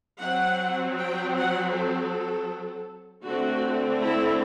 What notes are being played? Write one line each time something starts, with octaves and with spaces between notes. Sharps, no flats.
F#3 C4 F#5
G5
F#5
A4
D3 A3 C4 F#4
E4